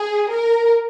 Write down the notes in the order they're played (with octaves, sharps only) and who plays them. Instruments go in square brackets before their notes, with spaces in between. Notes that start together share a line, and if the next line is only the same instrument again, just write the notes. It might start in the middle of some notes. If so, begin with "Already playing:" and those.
Already playing: [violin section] G#4
A#4